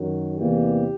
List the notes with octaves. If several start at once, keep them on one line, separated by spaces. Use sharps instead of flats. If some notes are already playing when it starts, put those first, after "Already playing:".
Already playing: F#2 D#3 F#3
E2 C3 E3 G3 A#3 G4